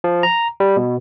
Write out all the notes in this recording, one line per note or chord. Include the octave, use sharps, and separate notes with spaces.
F3
A#5
G3
B2